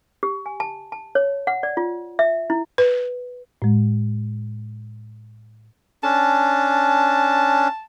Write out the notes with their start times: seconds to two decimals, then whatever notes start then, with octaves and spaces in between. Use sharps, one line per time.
0.23 G4
0.46 G#5
0.60 A5
0.92 A5
1.15 C#5
1.47 F#5
1.63 D5
1.77 F4
2.19 E5
2.50 E4
2.78 B4
3.62 A2 G#3
6.03 C#4 D4 A5